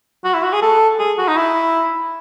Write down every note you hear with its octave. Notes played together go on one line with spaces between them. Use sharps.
F#4
E4
F#4
G#4
A4
G#4
F#4
D#4
E4